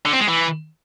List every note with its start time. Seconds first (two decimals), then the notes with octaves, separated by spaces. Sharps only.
0.05 D3
0.13 C4
0.20 G#3
0.28 E3